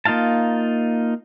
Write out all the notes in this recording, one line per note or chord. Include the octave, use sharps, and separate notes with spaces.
A#3 D#4 F4 F5 A5